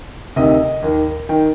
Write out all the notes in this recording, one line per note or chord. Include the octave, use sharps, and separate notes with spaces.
D2 C3 D#3 D#5
D#2 D#3
D#3 G5